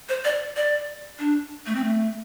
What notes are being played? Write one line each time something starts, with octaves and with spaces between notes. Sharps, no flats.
C5
D5
D5
D4
A3
C4
A3